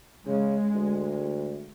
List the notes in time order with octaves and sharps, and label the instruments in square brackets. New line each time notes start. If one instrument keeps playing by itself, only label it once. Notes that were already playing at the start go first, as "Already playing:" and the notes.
[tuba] C#3 [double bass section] G#3
[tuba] D2